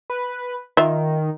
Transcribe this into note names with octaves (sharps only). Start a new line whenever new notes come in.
B4
D#3 F4 E5